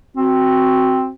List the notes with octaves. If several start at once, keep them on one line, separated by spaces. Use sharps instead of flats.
C4 F#4